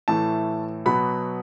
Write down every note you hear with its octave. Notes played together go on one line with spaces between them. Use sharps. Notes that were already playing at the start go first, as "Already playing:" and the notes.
A2 E3 A3 A5
B2 F#3 B3 B5